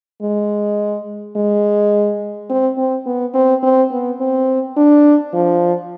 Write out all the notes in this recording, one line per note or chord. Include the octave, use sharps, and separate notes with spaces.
G#3
G#3
C4
C4
B3
C4
C4
B3
C4
D4
F3